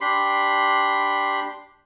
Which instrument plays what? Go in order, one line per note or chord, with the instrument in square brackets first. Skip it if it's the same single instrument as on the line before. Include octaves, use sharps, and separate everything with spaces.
[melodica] D4 G4 B5 C6